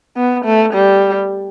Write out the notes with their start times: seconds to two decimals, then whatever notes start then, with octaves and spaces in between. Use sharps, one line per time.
0.17 B3
0.45 A3
0.74 G3